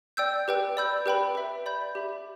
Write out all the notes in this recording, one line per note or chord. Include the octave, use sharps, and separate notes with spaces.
D5 G5 E6 G6
G4 B4 G5
D5 B5 E6 G6
G4 B4 G5 B5
B4 E5 B5
D5 B5 G6
G4 E5 B5